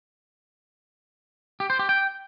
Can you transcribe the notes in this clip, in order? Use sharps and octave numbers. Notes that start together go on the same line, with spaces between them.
G4
C5
G4
G5